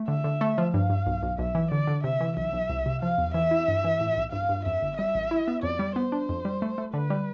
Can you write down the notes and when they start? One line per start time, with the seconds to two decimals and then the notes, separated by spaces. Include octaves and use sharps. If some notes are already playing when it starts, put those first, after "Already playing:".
Already playing: A3
0.08 D3 E5
0.24 D3
0.41 A3
0.58 F3
0.73 G2 F5
0.90 G2
1.06 B1
1.22 B1
1.39 B1 E5
1.55 E3
1.72 D3 D5
1.87 D3
2.04 C3 E5
2.21 E3
2.37 B1 E5
2.53 B1
2.69 C2
2.86 C3
3.02 F3 F5
3.18 E2
3.34 E3 E5
3.51 E4
3.68 G2
3.84 E3
4.01 A2
4.17 B1
4.32 G2 F5
4.49 G2
4.66 F2 E5
4.82 G1
4.98 G3 E5
5.15 A1
5.31 E4
5.48 B3
5.63 F2 D5
5.79 G3
5.96 B3 C5
6.12 D4
6.29 F2
6.45 G3
6.62 A3
6.78 A3
6.94 D3 B4
7.10 G3